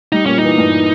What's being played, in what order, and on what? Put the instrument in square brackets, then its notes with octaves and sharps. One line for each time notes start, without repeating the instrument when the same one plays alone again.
[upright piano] G3 [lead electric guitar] D#4
[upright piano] A#2 [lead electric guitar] C#4
[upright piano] E3 [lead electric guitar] D#4
[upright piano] G2